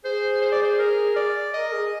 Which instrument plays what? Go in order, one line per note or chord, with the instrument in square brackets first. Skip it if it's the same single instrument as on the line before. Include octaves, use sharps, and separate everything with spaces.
[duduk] G#4 [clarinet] C5
[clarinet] C5
D5
C5
A#4
D5
[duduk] A#4 [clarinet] D#5
[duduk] G#4